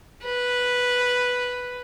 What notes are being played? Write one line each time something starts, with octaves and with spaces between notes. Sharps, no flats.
B4